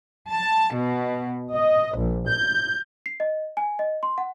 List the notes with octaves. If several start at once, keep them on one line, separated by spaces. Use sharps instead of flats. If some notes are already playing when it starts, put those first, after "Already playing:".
A5
B2
D#5
A#1
G6
C7
D#5
G#5
D#5
C6
F#5